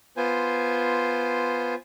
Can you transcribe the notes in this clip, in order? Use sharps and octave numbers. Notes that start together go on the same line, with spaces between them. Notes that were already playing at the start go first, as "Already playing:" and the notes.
B3 F4 C5 G#5